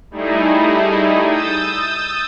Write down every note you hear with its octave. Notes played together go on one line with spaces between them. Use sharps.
G3 A3 D#4 E4 G#4
D#6 E6 G6 A6